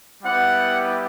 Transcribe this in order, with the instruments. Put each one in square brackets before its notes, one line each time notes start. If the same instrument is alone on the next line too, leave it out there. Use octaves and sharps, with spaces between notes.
[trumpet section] G3 B3 E4 G4 F#5